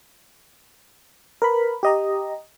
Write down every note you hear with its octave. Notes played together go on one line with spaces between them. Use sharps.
A#4 B4 B5
G4 D#5 A#5